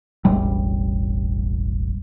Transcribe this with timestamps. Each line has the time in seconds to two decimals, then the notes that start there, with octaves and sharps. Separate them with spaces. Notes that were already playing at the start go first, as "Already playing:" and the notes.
0.25 E1 A1 G3